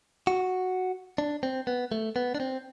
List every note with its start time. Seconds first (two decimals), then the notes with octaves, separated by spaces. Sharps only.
0.27 F#4
1.18 D4
1.43 C4
1.67 B3
1.92 A3
2.16 B3
2.35 D4
2.40 C4